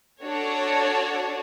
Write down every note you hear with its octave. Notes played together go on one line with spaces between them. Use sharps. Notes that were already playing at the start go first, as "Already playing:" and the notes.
D4 F#4 A4 C#5